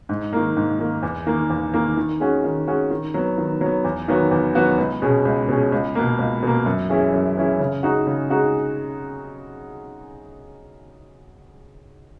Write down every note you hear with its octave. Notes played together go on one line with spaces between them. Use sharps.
G#2
D#3 A#3
G#2
D#3 A#3
E2
D#3 A#3
E2
D#3 A#3
D#3
G#3 C#4 F#4
D#3
G#3 C#4 F#4
D#3
F#3 B3
D#3
F#3 B3
E2
D#3 F#3 B3 F#4
E2
D#3 F#3 B3 F#4
C#2
B2 G#3 C#4
C#2
B2 G#3 C#4
C#2
B2 A#3
C#2
B2 A#3
F#2
E3 G#3 C#4 E4
F#2
E3 G#3 C#4 E4
C#3
G#3 D#4 F#4
C#3
G#3 D#4 F#4